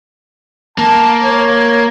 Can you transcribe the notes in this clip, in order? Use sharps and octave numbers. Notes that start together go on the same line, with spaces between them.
A#3 A5
C#5